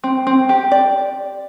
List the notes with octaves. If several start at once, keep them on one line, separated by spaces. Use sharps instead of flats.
C4
C4
G4
D5